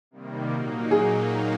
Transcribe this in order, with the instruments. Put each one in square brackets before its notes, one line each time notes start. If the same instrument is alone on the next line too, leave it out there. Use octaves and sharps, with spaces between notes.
[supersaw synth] C3 D#3 G3 A#3
A#2 F#3 A#3 D#4
[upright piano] G#4